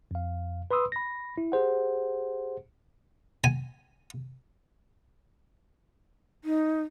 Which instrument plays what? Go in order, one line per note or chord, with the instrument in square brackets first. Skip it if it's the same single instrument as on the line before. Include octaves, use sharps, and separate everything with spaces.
[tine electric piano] F2 F5
B4 B5 C6 D#6 E6
B5 A#6
E4
G4 G#4 C5 F#5
[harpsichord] G#5
[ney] D#4